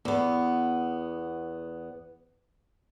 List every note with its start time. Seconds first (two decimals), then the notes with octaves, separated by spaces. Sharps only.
0.05 E2 B3